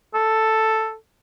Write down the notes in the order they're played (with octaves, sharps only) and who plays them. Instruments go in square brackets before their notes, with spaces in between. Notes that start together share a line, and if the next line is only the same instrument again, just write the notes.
[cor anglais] A4